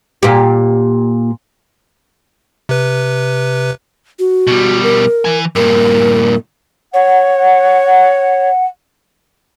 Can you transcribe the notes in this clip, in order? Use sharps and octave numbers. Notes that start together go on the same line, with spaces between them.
A#2 G4
C3 B4
F#4
B2 G3
A#4
E3 G#5
G2 A#2 A#4
C#5 F#5